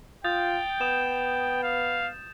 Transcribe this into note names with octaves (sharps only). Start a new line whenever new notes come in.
F4 G5 D#6 G6 A6
B3 D#6 E7
F5